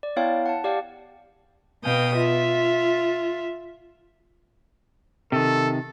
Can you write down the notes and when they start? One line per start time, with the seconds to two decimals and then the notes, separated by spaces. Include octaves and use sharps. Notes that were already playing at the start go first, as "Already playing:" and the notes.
0.03 D5
0.16 B3 E4 C#5 F5 G5 A5
0.46 F#5 A5
0.64 G4 D5 F5 G5
1.83 B2 F5 G5 D#6
2.16 F4 E5
5.32 C3 D#3 A4